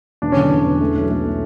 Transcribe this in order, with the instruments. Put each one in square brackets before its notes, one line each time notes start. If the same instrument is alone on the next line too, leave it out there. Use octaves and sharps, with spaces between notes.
[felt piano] E1 [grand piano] D4
[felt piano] D3 [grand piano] C#4
[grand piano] D4
[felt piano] E2
E2
A3
B1
A3
A3